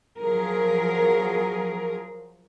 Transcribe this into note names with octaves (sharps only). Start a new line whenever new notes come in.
F3 F#3 G#4 A#4